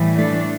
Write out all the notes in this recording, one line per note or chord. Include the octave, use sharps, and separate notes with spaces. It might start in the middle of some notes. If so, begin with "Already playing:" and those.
Already playing: A2 E3 G3
A3 D4